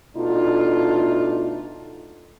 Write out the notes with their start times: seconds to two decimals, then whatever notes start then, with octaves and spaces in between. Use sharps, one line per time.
0.15 B2 A3 D4 D#4 F4